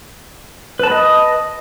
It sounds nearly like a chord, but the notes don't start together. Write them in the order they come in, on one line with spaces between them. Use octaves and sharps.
B4 A5 B5 D#5